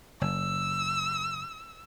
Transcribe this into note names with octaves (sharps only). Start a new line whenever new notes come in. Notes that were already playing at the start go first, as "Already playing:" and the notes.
F#1 E6